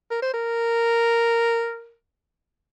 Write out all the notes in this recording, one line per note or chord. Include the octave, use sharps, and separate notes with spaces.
A#4
C5
A#4